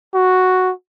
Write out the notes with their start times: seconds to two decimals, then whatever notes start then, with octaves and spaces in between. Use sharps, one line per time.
0.14 F#4